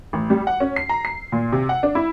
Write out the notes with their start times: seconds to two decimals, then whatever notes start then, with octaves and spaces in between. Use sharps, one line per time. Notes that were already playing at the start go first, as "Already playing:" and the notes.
0.13 A1
0.30 G3
0.47 F#5
0.60 C#4
0.76 C7
0.89 A#5
1.05 C7
1.32 A#2
1.52 C3
1.69 F#5
1.83 D4
1.95 E4